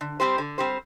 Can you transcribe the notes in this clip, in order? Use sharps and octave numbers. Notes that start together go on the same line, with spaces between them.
D3
G3 C4 G4 C5
D3
G3 C4 G4 C5